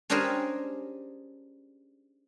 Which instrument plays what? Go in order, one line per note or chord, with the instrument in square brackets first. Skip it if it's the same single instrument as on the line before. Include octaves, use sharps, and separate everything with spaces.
[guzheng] C#4 D4 G4 G#4 A#4 C5